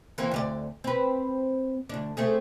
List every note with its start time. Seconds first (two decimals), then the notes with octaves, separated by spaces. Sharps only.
0.18 E3 A#3 C4
0.31 D2 G4 D5
0.84 C4 B4
1.89 D2 D4
2.17 A3 C4 G#4